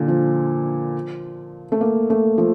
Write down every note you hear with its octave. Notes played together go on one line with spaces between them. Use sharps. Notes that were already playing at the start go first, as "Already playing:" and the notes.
Already playing: A#2 D3
F3
A3
A#3
A3
F3